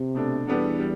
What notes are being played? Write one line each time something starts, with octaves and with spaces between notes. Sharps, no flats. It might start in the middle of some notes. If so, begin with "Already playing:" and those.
Already playing: C3
B2 A3 D4
E2 G3 B3 D4 A4
G3